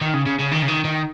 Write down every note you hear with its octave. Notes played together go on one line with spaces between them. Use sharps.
D#3
C#3
C#3
C#3
D#3
C#3
D#3
D#3